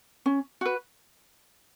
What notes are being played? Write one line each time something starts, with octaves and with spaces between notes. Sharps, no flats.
C#4
F#4 B4